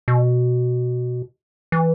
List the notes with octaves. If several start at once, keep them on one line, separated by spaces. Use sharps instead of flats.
B2
E3